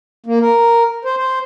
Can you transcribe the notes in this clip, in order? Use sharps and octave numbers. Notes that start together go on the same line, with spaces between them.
A#3
A#4
C5
C5